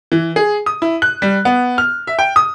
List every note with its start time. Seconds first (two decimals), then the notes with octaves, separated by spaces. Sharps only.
0.12 E3
0.36 G#4
0.66 D#6
0.82 E4
1.02 F#6
1.22 G3
1.45 B3
1.78 F6
2.07 E5
2.19 G5
2.36 D#6